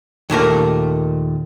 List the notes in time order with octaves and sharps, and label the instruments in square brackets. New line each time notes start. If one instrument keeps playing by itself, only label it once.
[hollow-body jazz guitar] D#2 A#2 A3 A#4